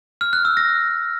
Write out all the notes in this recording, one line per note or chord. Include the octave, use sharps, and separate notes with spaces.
F6
F#6
E6
A#6